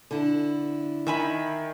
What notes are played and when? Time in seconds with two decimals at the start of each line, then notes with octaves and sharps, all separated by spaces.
0.11 D3 E4
1.07 D#3 E5 G#5 B5